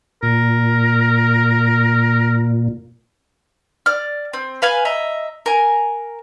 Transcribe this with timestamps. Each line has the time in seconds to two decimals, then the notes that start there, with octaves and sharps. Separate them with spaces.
0.23 A#2 A#4
3.86 D5 F6
4.33 C4
4.62 B4 F5 G#5
4.85 D#5 E5 A#5
5.46 A#4 G#5